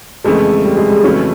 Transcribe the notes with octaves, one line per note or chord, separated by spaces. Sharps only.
F2 C#3 E3 G#3 A3
G3
G#3
G3
F2 C#3 E3 F#3 A3 C#4